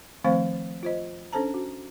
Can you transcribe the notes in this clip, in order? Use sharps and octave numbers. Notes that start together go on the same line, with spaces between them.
D#3 F3 A3 C4 C5 F5
F4 C5 D#5
C#4 D4 A4 C5 A5 A#5
F#4